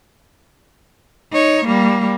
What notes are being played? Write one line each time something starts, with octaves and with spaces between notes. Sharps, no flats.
D#4 C#5
G3 A#3